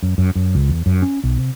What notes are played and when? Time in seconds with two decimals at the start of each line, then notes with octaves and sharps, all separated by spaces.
0.03 F#2
0.18 F#2
0.35 F#2
0.55 C#2
0.69 E2
0.86 F#2
1.02 C#4
1.24 B1
1.38 C3